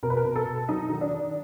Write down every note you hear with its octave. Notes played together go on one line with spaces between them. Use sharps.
B2 A#4
B4
A#4
B2
A4
B2
F#3 D#4
D#3
D4
D#3